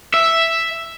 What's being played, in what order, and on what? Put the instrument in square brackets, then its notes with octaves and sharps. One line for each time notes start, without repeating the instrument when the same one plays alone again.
[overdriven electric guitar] E5